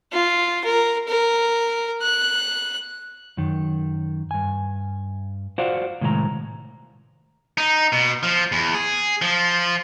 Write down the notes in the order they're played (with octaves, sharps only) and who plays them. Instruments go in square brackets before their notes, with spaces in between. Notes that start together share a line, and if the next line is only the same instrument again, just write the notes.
[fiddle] F4
A#4
A#4
F#6
[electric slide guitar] F#2 D#3
G2 G#5
F4 F#4 C5 D5 F5 F#5
A2 C3 D#3 G#3 D5 A#5
[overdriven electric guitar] D#4
B2
F3
E2
G#4
F3